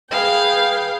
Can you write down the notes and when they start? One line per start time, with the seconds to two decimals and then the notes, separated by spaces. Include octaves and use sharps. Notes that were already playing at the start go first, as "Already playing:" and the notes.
0.10 G#4 B4 F5 G5